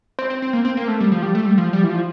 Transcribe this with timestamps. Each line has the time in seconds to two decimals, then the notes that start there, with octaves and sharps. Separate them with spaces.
0.19 C4
0.30 C4
0.42 C4
0.53 A#3
0.65 C4
0.77 A#3
0.88 A3
1.00 G3
1.12 F3
1.23 G3
1.35 A3
1.46 G3
1.58 F3
1.73 G3
1.84 E3
1.89 F3